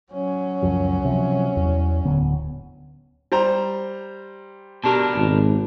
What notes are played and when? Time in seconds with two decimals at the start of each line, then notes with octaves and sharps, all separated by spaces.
0.12 F#3 C#4
0.62 C#2 F#2 F3
1.05 C3 F3
1.57 E2
2.04 D1 D3 B3
3.32 G3 C5 A#5
4.84 B2 D4 G4 A#4 A5
5.16 G#1